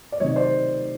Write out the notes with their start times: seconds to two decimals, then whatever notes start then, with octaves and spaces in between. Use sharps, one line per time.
0.12 D5
0.20 C3 D#3 F#3 C#5 D#5
0.36 C5 D5